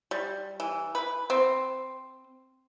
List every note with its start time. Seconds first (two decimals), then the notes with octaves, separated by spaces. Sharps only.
0.11 G3
0.60 E3
0.95 B4
1.30 C4